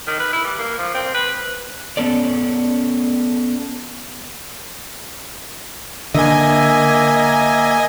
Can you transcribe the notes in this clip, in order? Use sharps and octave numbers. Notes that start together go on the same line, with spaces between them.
D#3
B4
E4
G3
A#3
F3
C4
B4
B3 C#4 A4 D5
D3 A#3 D#5 E5 G#5